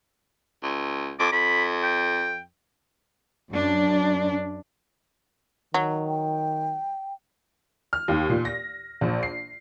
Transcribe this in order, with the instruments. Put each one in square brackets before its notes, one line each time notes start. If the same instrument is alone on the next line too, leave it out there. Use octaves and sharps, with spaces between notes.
[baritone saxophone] C#2
[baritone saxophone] F2 [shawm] D6
[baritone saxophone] F2 [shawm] B5
[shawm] G5
[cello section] F#2 D4
[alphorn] D#3 [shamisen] F#3
[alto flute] G5
[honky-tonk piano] F6
D#2
A#2
A#6
A#1
C7